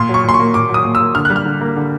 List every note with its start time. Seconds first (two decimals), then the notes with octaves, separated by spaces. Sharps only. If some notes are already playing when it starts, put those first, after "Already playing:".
Already playing: A#2 C6
0.09 F#3 C#6
0.24 A#2 C6
0.34 C#6
0.40 A#3
0.54 A#2 D6
0.69 F#3
0.74 D#6
0.85 A#2
0.95 E6
1.00 A#3
1.15 D3 F6
1.25 G3 F#6
1.36 F6
1.46 D3
1.61 A#3
1.76 D3